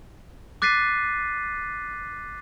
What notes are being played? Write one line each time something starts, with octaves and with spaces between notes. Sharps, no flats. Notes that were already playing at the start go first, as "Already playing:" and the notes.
D6 F#6 A6 B6 C7 D#7